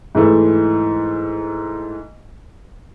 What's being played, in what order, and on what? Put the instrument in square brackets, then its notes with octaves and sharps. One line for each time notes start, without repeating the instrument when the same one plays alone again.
[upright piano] G#2 E3 A3